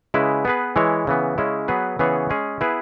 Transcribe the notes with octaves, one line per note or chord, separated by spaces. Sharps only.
C#3 G#3 E4 B4
B3 G#4 B4
E3 G#3 E4 C#5
C#3 E3 B3
C#3 G#3 C#4 E4
F#3 B3 G#4 B4
C#3 E3 B3 G#4 C#5
G#3 C#4 G#4
B3 E4 G#4 B4